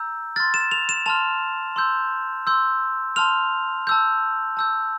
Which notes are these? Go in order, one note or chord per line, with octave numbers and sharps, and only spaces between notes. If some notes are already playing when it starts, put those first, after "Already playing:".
Already playing: A#5 E6 G6
C6 F6 A6
E7
F7
E7
A5 C6 F6 F7
C6 E6 G6
C6 E6 G6
A5 C6 F6 F7
A5 E6 G6
A5 E6 G6